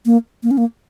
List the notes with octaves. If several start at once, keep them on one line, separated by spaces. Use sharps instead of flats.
A#3
A#3
C#4
A#3